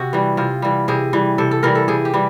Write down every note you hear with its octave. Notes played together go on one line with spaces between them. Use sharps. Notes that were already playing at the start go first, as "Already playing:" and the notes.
Already playing: C3 F#4
E3 G3
C3 F4
E3 G3
C3 G#4
E3 G3
C3 A4
A4
E3 G3 A#4
A4
C3 G#4
G4
E3 G3